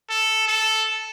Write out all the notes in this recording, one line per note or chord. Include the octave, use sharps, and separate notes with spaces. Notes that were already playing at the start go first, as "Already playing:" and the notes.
A4
A4